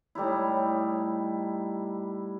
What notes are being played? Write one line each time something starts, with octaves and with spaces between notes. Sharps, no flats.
A2 G3 D#4 E4